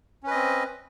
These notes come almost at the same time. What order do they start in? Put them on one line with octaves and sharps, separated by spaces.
C#4 B4 D#5 C4